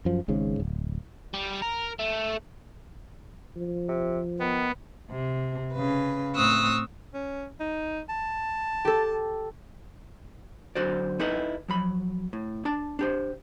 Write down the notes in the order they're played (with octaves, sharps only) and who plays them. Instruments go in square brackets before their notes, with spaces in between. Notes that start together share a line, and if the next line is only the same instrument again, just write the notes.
[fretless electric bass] F#2 F3
G#1 G#2 C#3
D1
[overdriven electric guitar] G3
A#4
A3
[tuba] F3
[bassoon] C3
[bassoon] D#3 [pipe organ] B3
[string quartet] C3
C#3 B4
A2 C4 C#6 D#6 E6 F#6
[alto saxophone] C#4
D#4
A5
[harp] G4 A4
[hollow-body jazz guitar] F#2 D3 F#4 C5 D5
D#4 E4 A4 B4 D#5
F3 F#3 B5
A2
D4 A5
D4 G4 C5